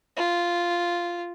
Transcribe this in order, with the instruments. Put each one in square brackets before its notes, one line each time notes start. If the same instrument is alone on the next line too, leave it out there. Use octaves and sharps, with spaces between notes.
[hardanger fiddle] F4